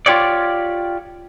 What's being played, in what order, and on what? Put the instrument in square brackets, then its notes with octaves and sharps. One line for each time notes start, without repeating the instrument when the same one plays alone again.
[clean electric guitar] F4 G4 C#5 D5